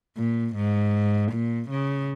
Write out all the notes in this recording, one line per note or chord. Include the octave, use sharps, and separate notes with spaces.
A#2
G#2
A#2
C#3